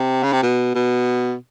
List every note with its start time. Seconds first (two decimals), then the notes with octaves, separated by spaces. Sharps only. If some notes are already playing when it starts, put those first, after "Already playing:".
Already playing: C3
0.23 C#3
0.32 C3
0.43 B2
0.75 B2